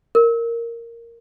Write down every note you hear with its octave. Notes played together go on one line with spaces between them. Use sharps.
A#4